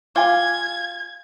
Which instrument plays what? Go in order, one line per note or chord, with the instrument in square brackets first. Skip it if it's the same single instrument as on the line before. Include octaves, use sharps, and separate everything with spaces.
[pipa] F4 [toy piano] F5 G#5 D6 [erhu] G#6